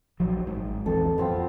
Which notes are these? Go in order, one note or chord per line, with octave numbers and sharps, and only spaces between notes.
A#1 F3 F#3
G#1 G#2
A#1 E2 C4 A4
F2 B3 C4 F4